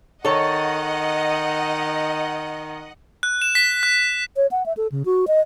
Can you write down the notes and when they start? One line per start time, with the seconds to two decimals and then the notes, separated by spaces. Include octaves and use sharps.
0.25 D#3 A4 C#5 D#5 F#5
3.23 F#6
3.42 E7
3.55 B6
3.83 F#6
4.37 C#5
4.51 F#5
4.66 E5
4.77 A4
4.92 C#3
5.06 F#4
5.28 D#5